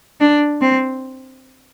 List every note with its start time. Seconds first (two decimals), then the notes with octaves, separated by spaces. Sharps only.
0.21 D4
0.61 C4